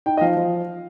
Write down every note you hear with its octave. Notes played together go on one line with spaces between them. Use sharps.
D#4 G5
D#5
F3 F5
F3